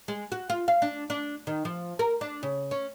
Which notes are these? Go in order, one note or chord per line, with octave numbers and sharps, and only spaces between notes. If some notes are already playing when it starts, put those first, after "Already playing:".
G#3
F#4
F4
F5
D4
D4
D#3
F3
A#4
D4
C#3
C#4